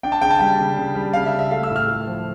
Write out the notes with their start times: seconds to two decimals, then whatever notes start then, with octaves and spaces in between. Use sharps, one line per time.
0.03 D4 G5
0.12 A5
0.21 C#3 G5
0.30 A5
0.39 G3 G5
0.59 C#3
0.76 C#3
0.95 G3
1.13 C#3 F5
1.26 E5
1.32 C#3
1.39 E5
1.51 A3 F5
1.63 E6
1.70 A2
1.76 F6
1.88 A3
2.07 F3